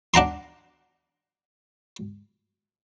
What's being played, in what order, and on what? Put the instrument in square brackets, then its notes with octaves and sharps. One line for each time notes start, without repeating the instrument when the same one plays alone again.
[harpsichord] D4 F#5 A#5 C6